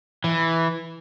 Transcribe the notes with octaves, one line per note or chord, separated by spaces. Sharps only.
E3